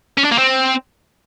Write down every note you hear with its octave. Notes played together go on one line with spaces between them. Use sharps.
C#4
D4
A#3
C4